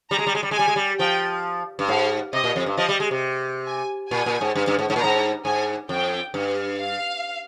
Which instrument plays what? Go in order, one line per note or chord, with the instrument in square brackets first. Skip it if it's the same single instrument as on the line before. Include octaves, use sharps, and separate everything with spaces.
[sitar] G3 [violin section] A#5
[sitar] G#3
G3
G#3
G3
G#3
[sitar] G3 [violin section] G#5
[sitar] G#3
G3
[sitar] F3 [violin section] G5
[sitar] G2
[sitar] G#2 [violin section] F5
[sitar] C3 [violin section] D#5
[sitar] A#2
F2
G2
[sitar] F3 [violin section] D#5
[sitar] G3
G#3
C3
[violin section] G#5
[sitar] A#2 [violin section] G#5
[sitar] A#2
G#2
G2
G2
G#2
G#2
A#2
[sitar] G#2 [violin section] A#5
[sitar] G#2 [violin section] G#5
[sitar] F2 [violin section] G5
[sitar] G2
[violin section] F5